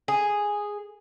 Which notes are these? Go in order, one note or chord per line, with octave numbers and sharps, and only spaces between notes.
G#4